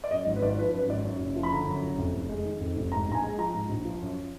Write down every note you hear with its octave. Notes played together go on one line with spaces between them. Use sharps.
D5
F#2 D#5
G#1
B4
G#1 D5
F3 B4
F#2 B4
G#1 D5
F#2
F#1
F3
B5
D3 A#5
F#2
F#1
F2
F1
G#3
D#3
F2
F1
G#2 A#5
A#1 A#5
G#5
G#3
F3 A#5
G#2
A#1
F3
F#2